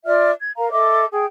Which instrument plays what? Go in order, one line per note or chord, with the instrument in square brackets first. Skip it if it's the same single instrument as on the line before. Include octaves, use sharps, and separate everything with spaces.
[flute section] F4 D5 E5 F6
G#6
A#4 F5 A#5
A4 D#5 E5 D6
G#4 G5